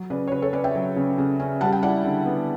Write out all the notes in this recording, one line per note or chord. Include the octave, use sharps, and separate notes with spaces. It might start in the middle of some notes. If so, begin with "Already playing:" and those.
Already playing: F#3
C#3 B4 D5
C#5
C#3 B4
A4 C#5
C#4 B4 D5
E5 G5
F#3
C#3
C#3
C#4
G3 F#5 A5
G5
E4 D5 F#5
D3
B3